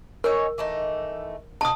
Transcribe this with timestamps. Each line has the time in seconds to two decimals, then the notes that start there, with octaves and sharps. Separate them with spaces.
0.24 C#4 D#4 A#4 C#5
0.58 E3 A3 D#4
1.61 B2 D3 F5 A5 D#6